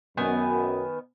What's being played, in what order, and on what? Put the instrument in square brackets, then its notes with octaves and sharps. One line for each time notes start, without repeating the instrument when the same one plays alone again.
[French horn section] F#2 [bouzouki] D#3 B3 G#5